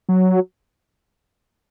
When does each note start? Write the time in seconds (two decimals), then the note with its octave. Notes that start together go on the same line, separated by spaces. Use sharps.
0.09 F#3